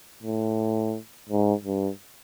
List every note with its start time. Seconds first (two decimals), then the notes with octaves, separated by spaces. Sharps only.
0.23 A2
1.29 G#2
1.65 G2